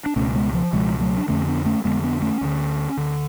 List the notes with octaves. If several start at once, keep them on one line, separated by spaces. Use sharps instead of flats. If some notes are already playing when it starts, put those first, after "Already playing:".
D4
C#2 B2 A3 C#4
A3
G#3 B3
F3
C#2 B2 F3 G#3
F#3 A3
D4
F2 D3 A3 C#4
B3 D4
A3 C#4
F2 D3 G#3 B3
B3 D4
A3 C#4
D2 D3
D2 D3